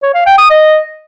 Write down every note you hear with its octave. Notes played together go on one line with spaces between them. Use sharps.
C#5
F5
G5
D#6
D#5